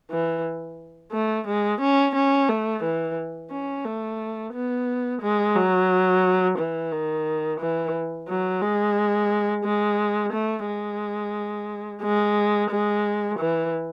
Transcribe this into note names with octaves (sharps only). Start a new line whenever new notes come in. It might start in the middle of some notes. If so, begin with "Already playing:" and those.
E3
A3
G#3
C#4
C#4
A3
E3
C#4
A3
B3
G#3
F#3
E3
D#3
E3
F#3
G#3
G#3
A3
G#3
G#3
G#3
E3